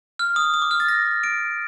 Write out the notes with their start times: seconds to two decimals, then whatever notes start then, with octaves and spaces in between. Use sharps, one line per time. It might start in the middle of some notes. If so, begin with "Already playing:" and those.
0.19 F6
0.36 D#6
0.54 D#6
0.62 D6
0.71 F6
0.80 A6
0.88 A#6
1.24 D7